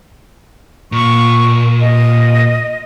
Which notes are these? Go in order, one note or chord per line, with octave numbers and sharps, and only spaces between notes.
A#2 C#6
D#5